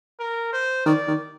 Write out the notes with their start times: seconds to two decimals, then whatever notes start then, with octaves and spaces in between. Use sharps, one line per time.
0.20 A#4
0.53 C5
0.86 D#3 D5
1.08 D#3